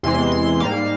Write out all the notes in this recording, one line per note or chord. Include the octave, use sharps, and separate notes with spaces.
E2 C3 E3 G#3 C6
C6
G#2 G3 A#3 F5